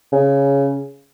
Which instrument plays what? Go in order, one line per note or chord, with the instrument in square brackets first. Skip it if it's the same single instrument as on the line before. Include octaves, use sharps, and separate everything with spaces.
[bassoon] C#3